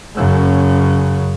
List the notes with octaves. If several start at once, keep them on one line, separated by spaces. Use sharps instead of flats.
F#2 C#3